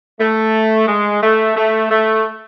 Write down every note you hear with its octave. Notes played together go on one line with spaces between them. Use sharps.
A3
G#3
A3
A3
A3